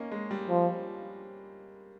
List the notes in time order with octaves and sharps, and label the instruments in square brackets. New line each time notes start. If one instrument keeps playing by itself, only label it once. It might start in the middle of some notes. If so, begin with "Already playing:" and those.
Already playing: [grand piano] A#3 C#4 D#4
G#3
G3
[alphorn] F3